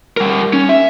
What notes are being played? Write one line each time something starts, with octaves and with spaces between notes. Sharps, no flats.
G3 A#4
C#4
E5